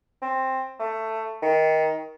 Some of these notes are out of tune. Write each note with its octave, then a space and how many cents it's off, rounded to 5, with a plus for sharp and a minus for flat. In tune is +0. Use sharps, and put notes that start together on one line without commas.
C4 +10
A3 +15
D#3 +20